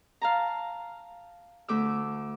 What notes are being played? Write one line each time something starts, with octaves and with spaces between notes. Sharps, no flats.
F5 A5 A#5
D2 A3 D6 E6